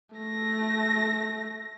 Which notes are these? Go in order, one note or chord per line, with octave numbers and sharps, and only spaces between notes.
A3 A#6